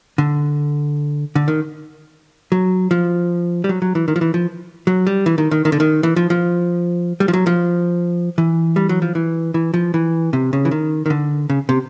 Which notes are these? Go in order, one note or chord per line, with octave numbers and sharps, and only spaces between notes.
D3
D3
D#3
F#3
F3
G3
F#3
F#3
E3
D#3
F3
E3
F3
F#3
G3
E3
D#3
D#3
D#3
D3
D#3
E3
F3
F3
G3
F3
F#3
F3
E3
G3
F#3
F3
E3
E3
F3
E3
C3
C#3
E3
D#3
D#3
D3
C#3
C3